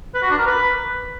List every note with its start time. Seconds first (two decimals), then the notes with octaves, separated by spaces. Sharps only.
0.14 B4
0.22 F#4
0.30 D4
0.39 A#4
0.47 B4